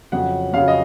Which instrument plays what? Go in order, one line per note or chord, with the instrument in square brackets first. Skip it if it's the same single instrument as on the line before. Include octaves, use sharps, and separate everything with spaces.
[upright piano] F2 C#3 F#3 F#5
F2 C#3 F#3 F5
D#5